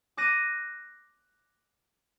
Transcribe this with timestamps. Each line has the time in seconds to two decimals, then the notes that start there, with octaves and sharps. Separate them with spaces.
0.17 D6 F#6 A#6 D#7